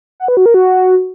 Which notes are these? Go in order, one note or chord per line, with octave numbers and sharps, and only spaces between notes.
F#5
B4
F#4
A#4
F#4